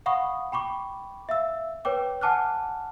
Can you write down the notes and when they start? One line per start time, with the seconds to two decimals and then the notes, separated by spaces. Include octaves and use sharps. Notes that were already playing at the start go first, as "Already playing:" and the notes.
0.06 F5 F#5 B5 C#6 D#6
0.52 G5 B5 C#6 D6
1.29 E5 F5 E6
1.85 B4 C#5 G5 D6
2.21 F#5 G#5 A5 D6 F6 F#6